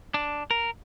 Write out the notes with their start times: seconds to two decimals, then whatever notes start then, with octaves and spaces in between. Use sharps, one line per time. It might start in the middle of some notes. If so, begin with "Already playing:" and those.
0.14 D4
0.51 A#4